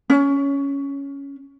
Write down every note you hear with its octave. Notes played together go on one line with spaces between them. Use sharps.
C#4